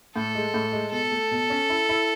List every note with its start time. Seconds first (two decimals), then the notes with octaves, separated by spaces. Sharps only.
0.16 A2 A4
0.35 G#3
0.54 A2
0.72 G#3
0.92 B2 A4
1.12 A3
1.31 B2
1.50 C#4
1.70 E4
1.89 E4